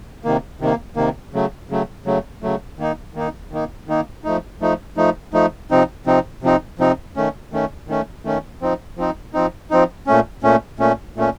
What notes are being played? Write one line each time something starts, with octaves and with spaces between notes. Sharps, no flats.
C3 D#3 A#3
C3 D#3 A#3
C3 D#3 A#3
C#3 F#3 A3
C#3 F#3 A3
C#3 F#3 A3
C#3 F#3 A3
D#3 A#3 D#4
D#3 A#3 D#4
D#3 A#3 D#4
D#3 A#3 D#4
F3 A3 D#4
F3 A3 D#4
F3 A3 D#4
F3 A3 D#4
C3 F3 C4 D#4
C3 F3 C4 D#4
C3 F3 C4 D#4
C3 F3 C4 D#4
D#3 A3 C#4
D#3 A3 C#4
D#3 A3 C#4
D#3 A3 C#4
F3 C4 D#4
F3 C4 D#4
F3 C4 D#4
F3 C4 D#4
A#2 A3 C#4
A#2 A3 C#4
A#2 A3 C#4
A#2 A3 C#4